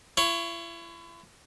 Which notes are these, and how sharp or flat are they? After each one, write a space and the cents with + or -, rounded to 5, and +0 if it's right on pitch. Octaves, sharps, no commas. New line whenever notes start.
E4 +40 C#5 +0